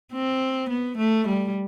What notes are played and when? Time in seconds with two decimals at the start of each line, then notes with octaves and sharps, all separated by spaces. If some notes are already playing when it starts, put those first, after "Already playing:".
0.13 C4
0.69 B3
0.98 A3
1.27 G3